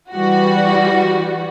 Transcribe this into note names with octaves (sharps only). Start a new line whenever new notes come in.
E3 G3 F#4